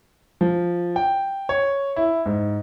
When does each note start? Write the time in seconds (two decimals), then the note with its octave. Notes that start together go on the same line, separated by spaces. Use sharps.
0.41 F3
0.96 G5
1.49 C#5
1.96 E4
2.26 G#2